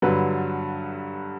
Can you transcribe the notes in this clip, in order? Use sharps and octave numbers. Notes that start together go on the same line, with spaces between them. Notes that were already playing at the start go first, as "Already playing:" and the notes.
G2 D3 F#3 B4